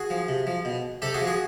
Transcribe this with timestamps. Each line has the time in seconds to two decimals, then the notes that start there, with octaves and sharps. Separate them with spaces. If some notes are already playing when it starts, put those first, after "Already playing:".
Already playing: F#4 G#4
0.10 F3
0.29 C3
0.47 F3
0.65 B2
1.02 C3 G4 A4
1.14 F#4 G#4
1.21 F3
1.27 F#4 G#4